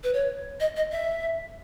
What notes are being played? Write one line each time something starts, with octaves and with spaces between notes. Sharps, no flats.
B4
C#5
D#5
D#5
E5